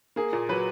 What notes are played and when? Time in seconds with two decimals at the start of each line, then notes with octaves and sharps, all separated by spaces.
0.16 A#3 G#4
0.33 A#2
0.49 F#3 B4